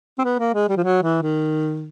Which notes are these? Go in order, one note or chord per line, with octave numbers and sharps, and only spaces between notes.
C4
B3
A#3
G#3
G3
F3
F#3
E3
D#3